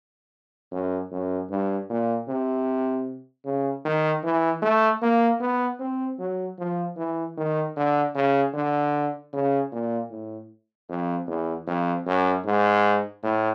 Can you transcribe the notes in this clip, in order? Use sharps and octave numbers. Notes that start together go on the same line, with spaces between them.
F#2
F#2
G2
A#2
C3
C#3
D#3
E3
A3
A#3
B3
C4
F#3
F3
E3
D#3
D3
C#3
D3
C#3
A#2
A2
F2
E2
F2
F#2
G#2
A2